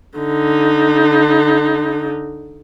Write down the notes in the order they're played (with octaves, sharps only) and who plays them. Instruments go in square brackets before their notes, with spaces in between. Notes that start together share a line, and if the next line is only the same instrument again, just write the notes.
[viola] D3 D#4